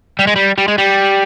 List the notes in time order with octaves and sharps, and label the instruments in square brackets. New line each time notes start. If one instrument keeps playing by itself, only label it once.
[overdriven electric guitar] G3
G#3
G3
G3
G#3
G3